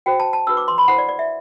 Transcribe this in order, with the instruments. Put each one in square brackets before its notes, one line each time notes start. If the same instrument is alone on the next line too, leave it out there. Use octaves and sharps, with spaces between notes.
[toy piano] F#4 C5 G5
A5
A5
D4 F#4 B4 E6
D6
C6
B5
E4 A4 C5 F#5
D5
D5
E5